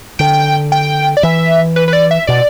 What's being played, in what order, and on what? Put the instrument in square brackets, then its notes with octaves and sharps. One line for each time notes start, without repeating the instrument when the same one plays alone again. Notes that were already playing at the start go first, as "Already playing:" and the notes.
[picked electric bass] D3 [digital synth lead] G5
[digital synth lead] G5
D5
[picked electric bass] E3 [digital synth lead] E5
[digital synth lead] B4
B4
D5
E5
[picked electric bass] B2 [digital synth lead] D5